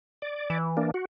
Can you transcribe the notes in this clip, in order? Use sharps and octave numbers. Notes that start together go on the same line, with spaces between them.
D5
E3
A#3 D4
F#4